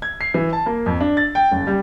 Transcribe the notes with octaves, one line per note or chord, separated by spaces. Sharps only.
G#6
C7
E3
A5
A#3
F2
D4
A6
G5
F#1
G3